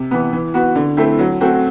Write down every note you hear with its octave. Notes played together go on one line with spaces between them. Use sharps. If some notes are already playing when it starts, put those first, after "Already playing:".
Already playing: C3
E3 B3
E3
B3 F#4
D3
A3 C4 E4
F#3
A3 C4 F#4